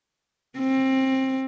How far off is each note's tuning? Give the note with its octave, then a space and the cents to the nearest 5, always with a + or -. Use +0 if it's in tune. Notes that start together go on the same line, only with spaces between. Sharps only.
C4 +20